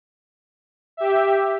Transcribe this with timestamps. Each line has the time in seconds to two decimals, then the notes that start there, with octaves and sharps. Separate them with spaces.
0.97 G4 E5